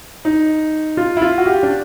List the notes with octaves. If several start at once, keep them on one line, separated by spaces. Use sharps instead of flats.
D#4
F4
E4
F4
F#4
G4
D4